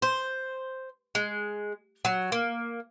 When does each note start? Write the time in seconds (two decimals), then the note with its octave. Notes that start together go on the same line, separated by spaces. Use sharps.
0.02 C5
1.15 G#3
2.05 F#3
2.32 A#3